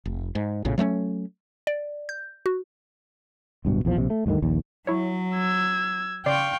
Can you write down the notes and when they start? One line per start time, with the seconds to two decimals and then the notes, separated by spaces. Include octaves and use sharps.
0.05 F1
0.35 G#2
0.65 A#1 A2 C#3
0.78 F#3 A3 B3 C#4
1.67 D5
2.09 G6
2.46 F#4
3.65 D1 G2 B2
3.85 A#1 E2 D#3 F3
3.97 A#1 C3
4.10 A3
4.26 D2 G2 D3 D#3
4.42 A#1 D#2
4.87 F#3 E4 C#5
5.35 E6 G#6
6.26 C#3 D5 F5 G5 C6 C#6